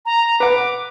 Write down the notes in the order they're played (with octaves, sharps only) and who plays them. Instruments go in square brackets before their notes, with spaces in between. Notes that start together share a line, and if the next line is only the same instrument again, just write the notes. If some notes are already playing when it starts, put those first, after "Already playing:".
[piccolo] A#5
[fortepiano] B4 F#5 [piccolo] D6